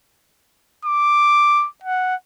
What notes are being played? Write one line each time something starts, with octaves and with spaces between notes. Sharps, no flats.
D6
F#5